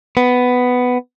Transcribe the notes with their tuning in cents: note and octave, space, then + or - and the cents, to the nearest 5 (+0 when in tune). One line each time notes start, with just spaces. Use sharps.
B3 +10